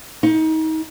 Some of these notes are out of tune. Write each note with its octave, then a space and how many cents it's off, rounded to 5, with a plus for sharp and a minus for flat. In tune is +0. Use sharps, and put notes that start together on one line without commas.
D#4 +30